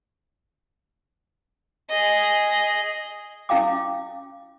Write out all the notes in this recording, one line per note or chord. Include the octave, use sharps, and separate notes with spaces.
G#4 D#5
C#4 E4 F5 G5 D6